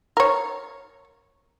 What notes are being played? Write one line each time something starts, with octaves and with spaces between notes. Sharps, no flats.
A#4 C#5